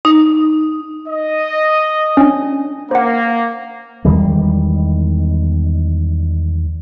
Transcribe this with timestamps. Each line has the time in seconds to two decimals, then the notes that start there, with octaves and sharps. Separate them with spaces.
0.05 D#4
1.09 D#5
2.17 C#4 D4
2.91 A#3 C5 F#5
4.05 E2 D#3 G3 G#3